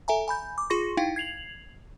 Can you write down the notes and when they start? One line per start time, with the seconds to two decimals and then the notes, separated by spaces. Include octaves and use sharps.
0.08 A4 E5 G#5 A#5
0.28 G#5 B5 G6
0.58 D6
0.70 F4 G#4 C6 C#6 A#6
0.97 D#4 E4 F5 G5
1.16 G#6 C7 F7 F#7